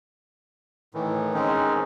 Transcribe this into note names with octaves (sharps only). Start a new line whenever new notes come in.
A2 D#3 E3
D#3 G#3 C4 C#4 D#4